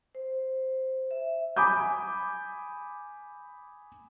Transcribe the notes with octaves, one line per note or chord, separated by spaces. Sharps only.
C5
E5
G#5 B5 D6 D#6 G6